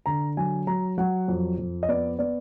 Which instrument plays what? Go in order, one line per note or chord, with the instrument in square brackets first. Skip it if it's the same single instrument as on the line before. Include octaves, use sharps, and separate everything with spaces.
[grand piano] D3 A#5
F#3 G#5
F#3 A#5
F#3 F#5
F2
F2
D#5
B3 D5
B3 D5